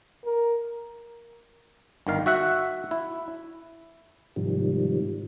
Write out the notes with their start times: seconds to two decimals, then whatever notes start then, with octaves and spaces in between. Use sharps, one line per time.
0.25 A#4
2.07 G1 D#3 F5
2.26 F#4 E5 F#5
2.91 E4
4.36 G#2 C3 D#3 F3 G3